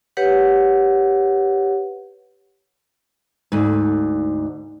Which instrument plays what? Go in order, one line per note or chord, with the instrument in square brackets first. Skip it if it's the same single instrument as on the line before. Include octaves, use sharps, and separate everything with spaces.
[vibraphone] G4 B4 C#5 F#5
[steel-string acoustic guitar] D2 G#2